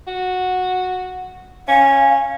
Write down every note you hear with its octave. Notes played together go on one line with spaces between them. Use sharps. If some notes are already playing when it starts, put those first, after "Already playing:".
F#4
C#4 F5